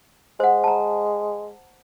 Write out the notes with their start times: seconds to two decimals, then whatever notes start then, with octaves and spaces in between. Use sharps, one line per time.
0.40 G#3 C5 F#5
0.64 A5 A#5